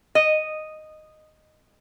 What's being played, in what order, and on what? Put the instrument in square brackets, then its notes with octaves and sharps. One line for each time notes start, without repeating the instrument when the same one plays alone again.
[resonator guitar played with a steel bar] D#5